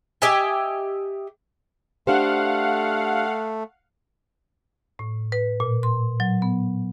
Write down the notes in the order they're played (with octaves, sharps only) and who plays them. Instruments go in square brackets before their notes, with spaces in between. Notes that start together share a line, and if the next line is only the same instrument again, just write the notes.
[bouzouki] G4 D#5 E5 G#5
[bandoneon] A3 [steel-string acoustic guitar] D4 A4 C5 [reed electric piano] G4 [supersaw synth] F5 F#5
[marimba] A2
B4
A#2
C6
F#3
B3